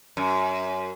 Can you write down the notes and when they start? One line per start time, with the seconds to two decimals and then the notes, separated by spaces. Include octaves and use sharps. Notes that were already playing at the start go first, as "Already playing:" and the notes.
0.17 F#2